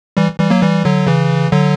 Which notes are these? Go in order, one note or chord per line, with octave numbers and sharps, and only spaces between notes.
E3 G3
E3 G3
F#3 A#3
E3 G3
D3 F#3
C#3 E3
D3 F#3